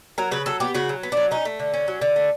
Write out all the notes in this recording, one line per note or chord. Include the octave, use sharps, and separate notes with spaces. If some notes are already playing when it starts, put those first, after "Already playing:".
F#3 A#4
C#3 B4
F#3 A4
B3 G4
C#3 F#4
F#3
B3
F#3 D4
C#4 D#4
A3
D3
C#4
F#3
D3
A3